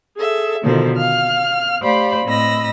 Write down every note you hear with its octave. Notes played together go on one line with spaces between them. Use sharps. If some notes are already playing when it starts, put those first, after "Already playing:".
G#4 A4 E5
B2 D3 D#3 F3 A4 C5
F5 F6
A3 G4 C5 D5 F5 B5
A2 C4 D#5 B5 E6 A#6